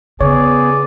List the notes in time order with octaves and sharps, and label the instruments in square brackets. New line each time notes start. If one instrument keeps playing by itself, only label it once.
[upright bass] C#3 [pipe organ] B3 G#4 [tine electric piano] C#5 [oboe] D5